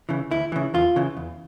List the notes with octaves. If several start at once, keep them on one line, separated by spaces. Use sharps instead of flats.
C#3 E3
D2 E4
C#3 E3
E2 F4
C#3 E3
E2